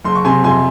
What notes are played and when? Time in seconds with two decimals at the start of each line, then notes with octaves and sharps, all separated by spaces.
0.05 F#1 C6
0.15 C#6
0.25 C3 G#5 C6
0.44 F2 G#5 C6